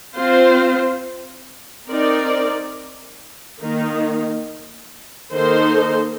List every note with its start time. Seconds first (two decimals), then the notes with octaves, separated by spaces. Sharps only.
0.17 C4 F4 C5
1.88 C4 D#4 A#4 D5
3.60 D#3 A#3 D#4
5.32 D#3 A#3 D#4 A4 C5